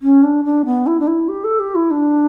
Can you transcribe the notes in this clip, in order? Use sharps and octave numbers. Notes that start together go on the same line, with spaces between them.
C#4
D4
D4
B3
E4
D4
E4
G4
A4
G4
E4
D4